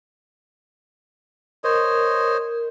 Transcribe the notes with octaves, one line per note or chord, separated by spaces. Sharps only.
A#4 C5 C#5 D#5